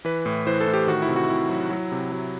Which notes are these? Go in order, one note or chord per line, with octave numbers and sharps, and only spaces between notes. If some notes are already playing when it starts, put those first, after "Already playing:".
E3 B4
A2
E3 C5
A4
A2
G4
D#3 F#4
E4
C3
F#4
C3 E4
F#3
F#3
C3
F#3